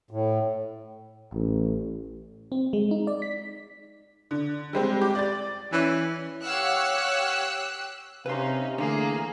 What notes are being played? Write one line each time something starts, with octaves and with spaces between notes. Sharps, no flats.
A2
A1
C4
G#3
D#4
D5
B6
D3
G3 G#3 C4
G4 D6
D5 A6
E3 C#4
G4 C#5 F5 F#5 E6 F#6
C3 C#4 D#4 B4 F5 C6
D3 E3 A3 A#3 G#4